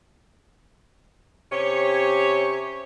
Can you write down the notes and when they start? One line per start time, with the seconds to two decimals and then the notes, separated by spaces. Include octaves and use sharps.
1.52 C3 C#4 G4 C#5